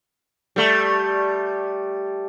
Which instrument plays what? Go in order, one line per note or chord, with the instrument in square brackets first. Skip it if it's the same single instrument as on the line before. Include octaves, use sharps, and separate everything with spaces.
[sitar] G3 A3